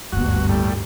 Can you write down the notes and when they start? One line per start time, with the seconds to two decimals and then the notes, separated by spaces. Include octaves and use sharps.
0.12 F#1 D2 G2 B3 F#4
0.49 A2 G3